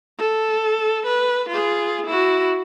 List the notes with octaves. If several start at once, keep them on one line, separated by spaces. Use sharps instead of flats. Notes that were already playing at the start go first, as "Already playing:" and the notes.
A4
B4
F4 G#4
E4 F#4